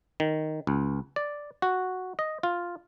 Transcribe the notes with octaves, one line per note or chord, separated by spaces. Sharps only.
D#3
C#2
D5
F#4
D#5
F4